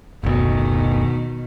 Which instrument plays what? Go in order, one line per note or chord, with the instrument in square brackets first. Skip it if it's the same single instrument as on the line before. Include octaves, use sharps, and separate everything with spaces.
[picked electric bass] F#1 D2 [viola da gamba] B2 D#3